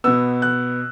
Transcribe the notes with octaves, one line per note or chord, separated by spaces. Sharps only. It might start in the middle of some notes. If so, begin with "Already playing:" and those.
B2 B3 E6
F#6